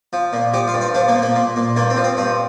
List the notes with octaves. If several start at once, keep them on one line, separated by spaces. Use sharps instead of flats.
F3
A#2
F3 G4
F4
G2
F4
F3 D4
A#3
A#2
A#3
A#2
A#2
G2 A#3
C4
F3
C4
G2 C4